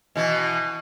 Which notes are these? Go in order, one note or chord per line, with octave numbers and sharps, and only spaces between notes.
B2 E3